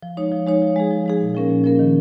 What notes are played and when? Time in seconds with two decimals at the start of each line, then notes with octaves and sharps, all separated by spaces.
0.03 F3
0.17 G#3 D#4 C#5
0.32 F3
0.47 G#3 D#4 C#5
0.62 F3
0.76 G#3 D#4 G#4
0.91 F3
1.06 G#3 D#4 G#4
1.21 A#2
1.35 F3 A#3 C#4 A#4
1.50 A#2
1.64 F3 A#3 C#4 A#4
1.79 D#3